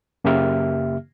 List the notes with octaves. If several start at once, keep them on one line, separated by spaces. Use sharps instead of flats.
F#2 C#3 A#3 G4 E5 F6